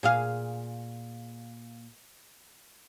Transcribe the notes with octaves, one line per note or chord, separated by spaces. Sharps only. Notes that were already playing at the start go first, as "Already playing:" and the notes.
A#2 G#4 F5